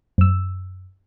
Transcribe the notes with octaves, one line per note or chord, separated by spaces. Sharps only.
F#2 E6